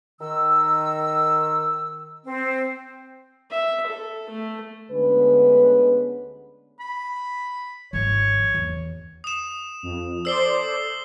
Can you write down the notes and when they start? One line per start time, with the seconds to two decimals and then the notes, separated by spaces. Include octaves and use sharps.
0.21 D#3 E6
2.26 C4
3.51 E5
3.87 A4
4.29 A3
4.92 D2 D3 G#3 B3 C#4 B4
6.80 B5
7.93 G#1 F3 C#5
8.55 E2
9.24 D#6 E7
9.83 F2
10.25 A4 C5 D5 E6 C7 G7